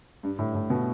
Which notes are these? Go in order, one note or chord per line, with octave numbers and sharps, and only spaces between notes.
G2
A2
A2
B2